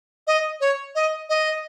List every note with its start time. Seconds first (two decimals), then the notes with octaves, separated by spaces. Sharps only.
0.27 D#5
0.61 C#5
0.95 D#5
1.29 D#5